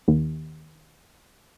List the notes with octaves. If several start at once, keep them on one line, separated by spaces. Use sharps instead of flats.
D#2